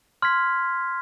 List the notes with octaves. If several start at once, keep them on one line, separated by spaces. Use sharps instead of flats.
C6 F6 G#6 B6